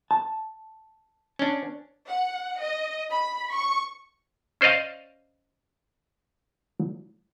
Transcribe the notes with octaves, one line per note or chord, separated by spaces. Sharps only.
A5
C#4 D4
F#5
D#5
B5
C#6
C#4 C5 D5 D#5 F5